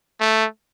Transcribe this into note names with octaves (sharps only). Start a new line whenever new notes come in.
A3